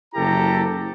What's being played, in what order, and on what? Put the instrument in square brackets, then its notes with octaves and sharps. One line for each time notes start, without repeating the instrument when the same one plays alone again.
[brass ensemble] F#1 E4 G4 A4 A#5